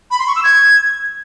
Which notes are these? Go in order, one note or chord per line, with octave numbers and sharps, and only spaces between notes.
B5
C6
C#6
E6
G#6